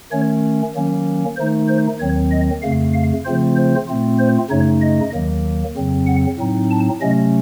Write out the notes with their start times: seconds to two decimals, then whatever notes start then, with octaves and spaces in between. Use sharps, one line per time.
0.11 D#3 A3 C#4 C#5
0.74 D#3 F#3 A#3 C#4
1.37 D#3 A3 D#4 C5
1.68 C5
1.99 D#2 D#3 F#3 C4 C#5
2.31 D#5
2.62 F2 C#3 A3 F5
2.94 F5
3.25 C#3 F3 A3 C4 F4 C5
3.56 C5
3.88 A#2 A3 C4 F4
4.19 C5
4.50 F#2 C#3 A3 D#4 C#5
4.82 D#5
5.13 D#2 D#3 F#3 A#3
5.76 F2 C#3 F#3 C4
6.07 F#5
6.39 A2 F#3 C4 D#4
6.70 A5
7.01 C3 F#3 A3 C#4 D#5